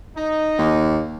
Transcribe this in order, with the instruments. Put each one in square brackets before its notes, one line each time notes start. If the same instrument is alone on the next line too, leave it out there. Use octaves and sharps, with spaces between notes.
[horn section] D#4
[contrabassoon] D#2